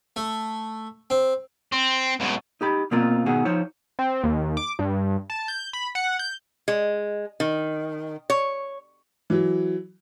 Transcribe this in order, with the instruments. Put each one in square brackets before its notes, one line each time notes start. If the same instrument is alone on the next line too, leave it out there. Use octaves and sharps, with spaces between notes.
[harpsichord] A3
C4
[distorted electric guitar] C4
C#2 B2
[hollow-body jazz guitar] D#4 G4 B5
B2 A#3 C4 F4 A#4
G#2 B2 D#3 F#4 G#4
F3 D#4 C5 C#5
[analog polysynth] C4
D#2
D6
G2
A5
G6
B5
F#5
G6
[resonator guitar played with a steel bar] G#3
D#3
C#5
[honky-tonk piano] E3 F#3